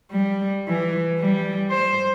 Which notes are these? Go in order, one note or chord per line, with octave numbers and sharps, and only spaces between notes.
G3
E3
G3
C5